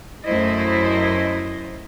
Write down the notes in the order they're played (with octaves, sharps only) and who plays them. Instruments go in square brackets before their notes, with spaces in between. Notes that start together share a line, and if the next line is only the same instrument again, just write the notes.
[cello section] F#2 A3 E4 C5 D#5